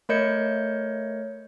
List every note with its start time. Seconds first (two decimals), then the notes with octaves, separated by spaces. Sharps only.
0.09 A3 A#4 C#5 D#5 G6 C#7